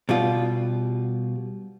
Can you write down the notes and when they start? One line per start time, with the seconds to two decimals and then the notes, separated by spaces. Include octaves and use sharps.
0.09 B2 G3 F4